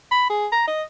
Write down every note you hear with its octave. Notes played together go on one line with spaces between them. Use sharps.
B5
G#4
A#5
D#5